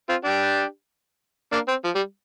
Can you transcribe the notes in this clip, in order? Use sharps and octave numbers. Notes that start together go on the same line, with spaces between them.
C4 F4
D4 G4
A#3 D4
C4
F3
G3